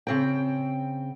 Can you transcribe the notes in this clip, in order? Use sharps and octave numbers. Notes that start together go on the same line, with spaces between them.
C#3 C4 G5